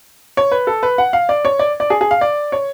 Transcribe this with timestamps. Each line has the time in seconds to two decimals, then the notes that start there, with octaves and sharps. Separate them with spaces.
0.37 C#5
0.51 B4
0.67 A4
0.83 B4
0.98 F#5
1.13 F5
1.29 D5
1.45 C#5
1.59 D5
1.80 D5
1.90 G#4
2.01 G#4
2.11 F5
2.21 D5
2.52 C#5